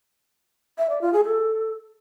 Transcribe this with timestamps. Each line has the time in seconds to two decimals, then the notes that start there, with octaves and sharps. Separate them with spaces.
0.78 E5
0.90 D5
1.01 F4
1.13 G#4
1.25 A4